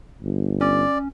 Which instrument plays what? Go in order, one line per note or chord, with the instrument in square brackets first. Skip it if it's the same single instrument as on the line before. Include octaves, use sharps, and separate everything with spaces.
[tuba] G1
[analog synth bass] C#4 [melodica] D5